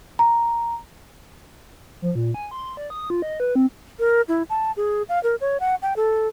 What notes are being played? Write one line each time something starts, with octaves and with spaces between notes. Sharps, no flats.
A#5
F3
A#2
G#5
C6
D5
D#6
F4
D#5
B4
C4
A#4
E4
A5
G#4
F5
A#4
C#5
F#5
G5
A4